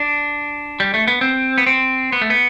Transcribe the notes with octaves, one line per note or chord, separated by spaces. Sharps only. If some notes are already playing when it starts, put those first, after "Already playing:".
Already playing: D4
G3
A3
B3
C4
B3
C4
B3
A3
B3